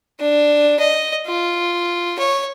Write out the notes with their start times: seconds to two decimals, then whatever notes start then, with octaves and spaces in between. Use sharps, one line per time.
0.20 D4
0.79 D#5
1.27 F4
2.19 C#5